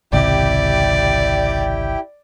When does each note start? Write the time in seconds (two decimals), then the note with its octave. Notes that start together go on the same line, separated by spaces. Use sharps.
0.13 G#1 C#2 C3 E4 G4 D5 G5